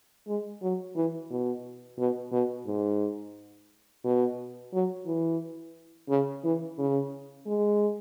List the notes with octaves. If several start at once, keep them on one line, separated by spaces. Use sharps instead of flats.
G#3
F#3
E3
B2
B2
B2
G#2
B2
F#3
E3
C#3
E3
C#3
G#3